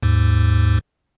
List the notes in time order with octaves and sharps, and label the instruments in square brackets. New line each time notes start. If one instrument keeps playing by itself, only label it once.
[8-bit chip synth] D#2 G#2